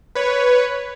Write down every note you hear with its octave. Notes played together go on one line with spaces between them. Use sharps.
B4 C#5